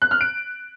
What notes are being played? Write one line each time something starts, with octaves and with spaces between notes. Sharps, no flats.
F#6
F6
D7